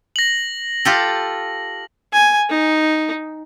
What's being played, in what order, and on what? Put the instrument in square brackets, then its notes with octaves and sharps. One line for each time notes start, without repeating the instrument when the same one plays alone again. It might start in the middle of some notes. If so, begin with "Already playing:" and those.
[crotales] A#6 F#7
[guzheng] F4 G4 A4
[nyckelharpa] G#5
D#4